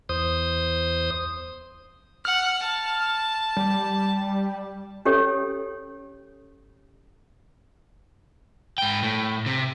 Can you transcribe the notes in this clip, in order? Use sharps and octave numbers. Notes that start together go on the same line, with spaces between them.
E2 C5 D#6
F#5 F6
A5
G3
C#4 G4 A4 C#5
G#2 G5
A2
C3